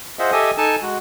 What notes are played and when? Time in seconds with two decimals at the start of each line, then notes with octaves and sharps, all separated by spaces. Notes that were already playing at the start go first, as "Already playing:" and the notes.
0.19 F4 G#4 C5 D#5 E5 F#5
0.32 G4 A4 D#5 E5 G#5 D#6
0.57 D#4 A4 G#5 A5
0.82 G#3 F#4